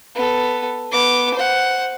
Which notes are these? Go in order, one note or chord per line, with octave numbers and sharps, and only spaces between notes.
B3 A4
B3 D6
C5 F#5